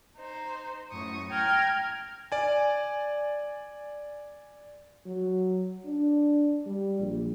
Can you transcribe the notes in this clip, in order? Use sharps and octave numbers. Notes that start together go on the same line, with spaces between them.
D#4 C5
F#2 A2 C#6 D#6
G5 A#5 F6 G#6 A6
D5 G#5
F#3
D4
G3
A#1